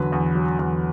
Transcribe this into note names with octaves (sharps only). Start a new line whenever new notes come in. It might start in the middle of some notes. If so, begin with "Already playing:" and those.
Already playing: E2 D3 F#3 B4
E2
F#3
E2